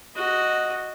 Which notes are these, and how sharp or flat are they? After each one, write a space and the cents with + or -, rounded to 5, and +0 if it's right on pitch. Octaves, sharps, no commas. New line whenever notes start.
F#4 +0 D#5 +0